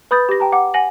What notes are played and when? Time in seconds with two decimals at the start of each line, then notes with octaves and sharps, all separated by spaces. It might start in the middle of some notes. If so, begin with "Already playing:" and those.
0.11 B4 B5 D#6 G6 A6
0.29 G4 A#6
0.40 G5 A5 A#5
0.52 F#5 D6
0.74 F#5 G#5 A#6 F#7